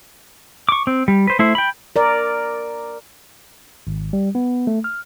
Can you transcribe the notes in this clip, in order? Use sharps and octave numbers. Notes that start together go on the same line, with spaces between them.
C#6 D6
C4
G3
B4 C5
A3 E4 C5
G5 B5
A#4 D5
G#1
G3
B3
A3
F6